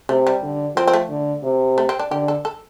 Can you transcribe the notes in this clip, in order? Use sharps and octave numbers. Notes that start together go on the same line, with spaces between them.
C3 A3
G3
D3
F3 C4
C4
A3
D3
C3
A3
C4
D4
D3 G4
A4
A4